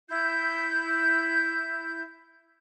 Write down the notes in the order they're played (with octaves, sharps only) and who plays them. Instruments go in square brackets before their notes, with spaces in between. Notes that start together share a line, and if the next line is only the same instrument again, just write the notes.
[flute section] E4 G6